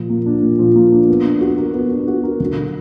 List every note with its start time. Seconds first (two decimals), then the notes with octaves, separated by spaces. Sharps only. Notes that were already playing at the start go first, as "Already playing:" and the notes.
Already playing: A#2 F3
0.10 A#3
0.26 D4
0.43 A#2
0.59 F3
0.76 A#3
0.92 D4
1.08 B3
1.25 D4
1.41 F#4
1.58 A#4
1.74 B3
1.91 D4
2.08 F#4
2.24 A#4
2.40 D3
2.57 F#3